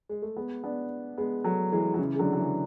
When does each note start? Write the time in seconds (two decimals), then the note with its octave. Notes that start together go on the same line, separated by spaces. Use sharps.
0.09 G#3
0.22 A3
0.37 G#3 B3
0.64 B3 D4
1.18 G#3 B3
1.44 F#3 A3
1.72 E3 G#3
1.94 F#3
1.99 C#3 E3
2.15 G#3
2.19 D3 F#3
2.33 F#3
2.39 C#3 E3